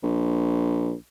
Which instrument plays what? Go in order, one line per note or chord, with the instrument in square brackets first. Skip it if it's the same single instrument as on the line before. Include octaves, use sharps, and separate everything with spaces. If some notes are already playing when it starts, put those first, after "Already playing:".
[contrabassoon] A#1